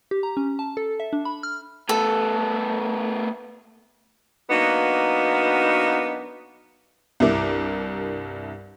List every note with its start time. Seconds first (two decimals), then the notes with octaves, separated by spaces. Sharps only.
0.11 G4
0.23 A#5
0.37 C#4
0.59 A5
0.77 A4
1.00 E5
1.13 D4
1.25 B5
1.43 F6
1.89 A3 B3 A4
4.50 F#3 A#3 B3 D4 D#4 F#4
7.20 C2 G2 E4 A#4 D6